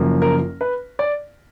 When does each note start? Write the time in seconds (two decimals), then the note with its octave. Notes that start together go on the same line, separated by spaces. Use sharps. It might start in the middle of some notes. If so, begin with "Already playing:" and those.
Already playing: F#1 F#2 F3 A#3
0.22 A#4
0.61 B4
0.99 D5